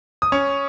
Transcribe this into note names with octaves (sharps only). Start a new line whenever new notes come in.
D#6
C#4 C#6